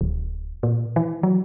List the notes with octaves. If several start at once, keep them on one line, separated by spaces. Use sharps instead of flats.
D1
A#2
E3
F#3